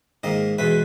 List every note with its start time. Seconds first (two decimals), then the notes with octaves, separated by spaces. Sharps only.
0.23 G#2 D#3 A#3 D#5
0.58 E2 B2 G#3 B4